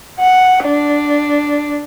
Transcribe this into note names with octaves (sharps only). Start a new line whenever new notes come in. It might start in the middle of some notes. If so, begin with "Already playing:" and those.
F#5
D4